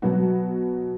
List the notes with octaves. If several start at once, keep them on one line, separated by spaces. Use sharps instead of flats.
B2 F#3 B3 F#4